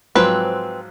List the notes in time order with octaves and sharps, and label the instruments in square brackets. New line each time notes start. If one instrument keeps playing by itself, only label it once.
[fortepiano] G#2 F3 F#3 [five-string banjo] C4 B4